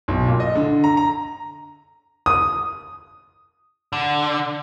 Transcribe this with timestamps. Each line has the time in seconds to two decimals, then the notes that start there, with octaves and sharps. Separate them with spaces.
0.08 B1
0.27 A#2
0.40 D#5
0.55 D3
0.84 A#5
0.97 A#5
2.26 D#6
3.93 D3